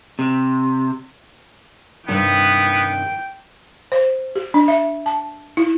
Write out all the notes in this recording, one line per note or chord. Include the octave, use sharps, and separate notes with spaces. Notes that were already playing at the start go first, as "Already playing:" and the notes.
C3
G2 C3 D#3 B3 G5
C5
G4
D4
E5
A5
E4